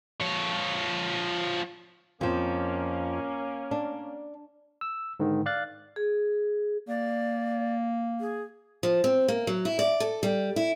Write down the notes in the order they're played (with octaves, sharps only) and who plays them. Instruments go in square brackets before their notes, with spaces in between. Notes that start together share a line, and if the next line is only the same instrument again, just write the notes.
[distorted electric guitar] F3 C#5
[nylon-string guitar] F2 F3 [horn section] A#3 C#4
[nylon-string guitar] D4
[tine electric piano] E6
G#2 D3 D#3
D5 F5 F#6 A6
[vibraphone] G#4
[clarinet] A#3 [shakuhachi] D5
[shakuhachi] G#4
[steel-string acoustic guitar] F3
C4
A#3
F#3
E4
D5
A4
G3
E4